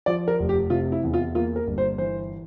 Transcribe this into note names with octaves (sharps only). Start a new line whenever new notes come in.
F3 D5
A#4
F1
G4
C3 F4
E4
E2
F4
A#3 F4
A#4
G1
C5
E3 C5